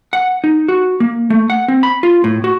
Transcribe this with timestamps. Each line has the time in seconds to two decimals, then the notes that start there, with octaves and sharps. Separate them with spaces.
0.13 F#5
0.44 D#4
0.68 F#4
1.00 A#3
1.30 A3
1.50 F#5
1.68 C4
1.83 B5
2.03 F4
2.24 A2
2.44 F#4